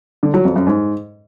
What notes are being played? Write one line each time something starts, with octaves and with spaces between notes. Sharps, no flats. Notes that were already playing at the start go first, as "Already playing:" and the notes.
D3
F#3
F2
F#2
G#2